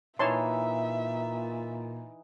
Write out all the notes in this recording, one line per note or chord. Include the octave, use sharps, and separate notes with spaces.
A#2 E3 D#4 C#5 E5 A5 C6